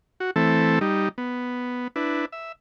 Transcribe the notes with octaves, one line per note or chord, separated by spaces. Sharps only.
F#4
E3 A3 C4 A4
G3 D#4
B3
D4 E4 B4
E5